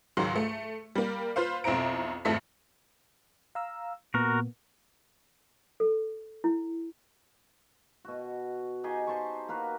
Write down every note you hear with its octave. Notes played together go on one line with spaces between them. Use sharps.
C#2 G#2 D#3 F#3 C6
A3
G3 A#3
F4 B4 C5 F5
B1 F2 C4 E4 A#5 D7
G#1 F2 A3 E4 A5 B6
F5 A#5 E6
A#2 A#3 B3 F#4 A#4
A4
E4
B2 F#4
D#4 G4 G#4 D#5
C5 A5 C6 C#6
A#3 F#4 A#4 B4